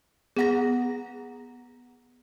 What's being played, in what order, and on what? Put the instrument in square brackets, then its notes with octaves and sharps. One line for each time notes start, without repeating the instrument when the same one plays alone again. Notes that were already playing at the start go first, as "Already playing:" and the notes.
[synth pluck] B3 A#5 [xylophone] G#4 F#5 A#6